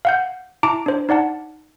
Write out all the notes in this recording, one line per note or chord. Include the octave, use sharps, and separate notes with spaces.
F5 F#5 G6
E4 A5 A#5 D6 D7
D4 C5
D#4 D5 F#5 A5